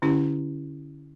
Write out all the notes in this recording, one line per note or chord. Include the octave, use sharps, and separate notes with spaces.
D3 C#4 E4 G4